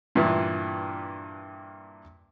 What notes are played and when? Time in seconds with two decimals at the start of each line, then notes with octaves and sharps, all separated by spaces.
0.15 G2 A#2 E3